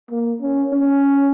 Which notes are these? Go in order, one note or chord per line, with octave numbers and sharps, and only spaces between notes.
A#3
C#4
C#4